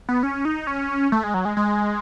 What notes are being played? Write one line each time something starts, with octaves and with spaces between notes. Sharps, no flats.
B3
C#4
D#4
C#4
A3
G#3
F#3
G#3
G#3